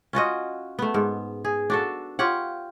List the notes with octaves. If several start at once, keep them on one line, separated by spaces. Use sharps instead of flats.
C#4 F4 F#4 D#5
A3 B3
G#2
G#4
D4 F#4 A4
F4 G4 C#5 F#5